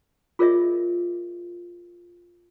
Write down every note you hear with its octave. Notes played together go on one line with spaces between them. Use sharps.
F4 G#4 A#4 C#5 D#5 E5